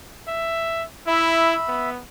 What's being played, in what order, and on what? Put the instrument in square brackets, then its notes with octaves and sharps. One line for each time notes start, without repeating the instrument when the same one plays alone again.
[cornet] E5
[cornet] E4 [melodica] E5 B5
[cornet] B3